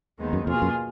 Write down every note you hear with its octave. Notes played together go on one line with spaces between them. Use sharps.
D#2 D#3 G#3 B3 D#4
F#2
F2 B2 A#3 F4 G#4
F#2